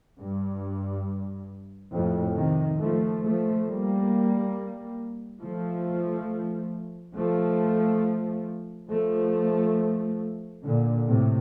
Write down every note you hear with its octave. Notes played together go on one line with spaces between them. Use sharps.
G2
F2 A2
C3 D#3
F3 A3
F3 A3
G3 A#3
F3 A3
F3 A3
F3 A3
A#2 D3
A2 C3